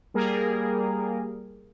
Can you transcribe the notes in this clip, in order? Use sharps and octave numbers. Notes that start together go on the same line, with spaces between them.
G3 A#3 G#4 A#4